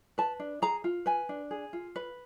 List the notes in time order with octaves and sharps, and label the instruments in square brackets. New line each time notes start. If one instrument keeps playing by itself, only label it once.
[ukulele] B4 A5
D4
G#4 A#5
F4
B4 G#5
D4
G#4
F4
B4